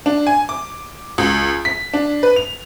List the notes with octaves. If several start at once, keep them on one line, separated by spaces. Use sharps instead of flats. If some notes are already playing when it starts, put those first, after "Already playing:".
D4
G#5
D6
C#2
B6
D4
B4
F7